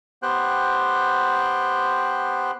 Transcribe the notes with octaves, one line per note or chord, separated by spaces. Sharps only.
B3 G4 C5 G5 F#6